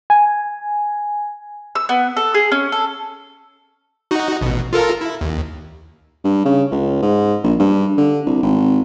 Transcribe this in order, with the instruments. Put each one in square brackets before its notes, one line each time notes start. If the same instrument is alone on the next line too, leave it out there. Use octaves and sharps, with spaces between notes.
[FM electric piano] G#5
[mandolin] E6
B3
A4
G#4
C#4
A4
[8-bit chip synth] D#4 F#4
A1 B2
F4 A4 A#4
E4
D#2
[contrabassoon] G2
C#3
C#2
G#2
A#1
G2
D3
C2
G#1